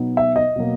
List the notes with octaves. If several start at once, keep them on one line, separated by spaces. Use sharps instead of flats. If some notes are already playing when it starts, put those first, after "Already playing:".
Already playing: B2 F#3 B3 D#4
E5
D#5
B2 F#3 A#3